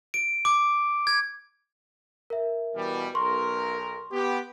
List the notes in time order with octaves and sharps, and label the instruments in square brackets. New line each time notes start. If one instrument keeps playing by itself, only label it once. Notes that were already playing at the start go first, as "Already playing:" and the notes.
[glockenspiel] D7
D6
G#6
[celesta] A#4 E5
[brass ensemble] B2 E3 G3
[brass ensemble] B1 A#4 [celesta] C6 C#6
[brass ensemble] B3 G4